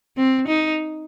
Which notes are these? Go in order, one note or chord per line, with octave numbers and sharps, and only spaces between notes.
C4
D#4